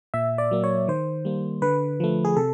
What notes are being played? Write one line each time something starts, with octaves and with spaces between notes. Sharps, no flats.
A#2 E5
D5
F#3 A#3
C#5
D#3 C5
G3 A#3
D3 B4
F3 A3
G#4
C3 A4